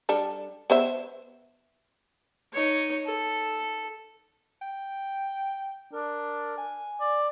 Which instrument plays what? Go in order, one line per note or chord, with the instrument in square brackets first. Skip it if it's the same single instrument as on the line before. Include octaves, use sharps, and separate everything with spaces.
[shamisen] G3 D4 A4
B3 C5 E5
[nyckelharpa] D#4 C#5
A4
[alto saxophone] G5
[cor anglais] D4 [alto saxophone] A#4
[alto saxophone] G#5
[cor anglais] D5